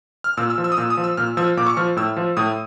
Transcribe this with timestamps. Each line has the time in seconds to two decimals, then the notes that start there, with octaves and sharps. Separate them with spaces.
0.24 F6
0.37 A#2 E6
0.50 E6
0.58 F3
0.64 E6
0.72 D#6
0.77 A#2 E6
0.90 D#6
0.97 F3
1.04 E6
1.17 A#2 F6
1.37 F3 E6
1.57 A#2 D6
1.66 C#6
1.77 F3 F6
1.97 A2 E6
2.17 F3
2.37 A2 D#6